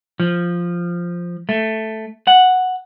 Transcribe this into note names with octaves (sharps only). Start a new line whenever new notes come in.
F3
A3
F#5